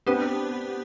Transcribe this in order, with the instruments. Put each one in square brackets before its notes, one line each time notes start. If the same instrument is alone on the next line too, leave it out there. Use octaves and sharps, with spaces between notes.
[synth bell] B3 D4 G4 B4 [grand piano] C4